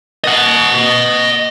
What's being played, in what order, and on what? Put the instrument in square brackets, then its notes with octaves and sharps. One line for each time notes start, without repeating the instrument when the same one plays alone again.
[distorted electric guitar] D#5 F#5